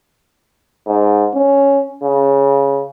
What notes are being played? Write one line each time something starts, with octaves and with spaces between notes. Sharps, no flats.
G#2
C#4
C#3